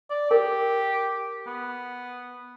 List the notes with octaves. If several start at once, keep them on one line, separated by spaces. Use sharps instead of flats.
D5
G4 A#4
B3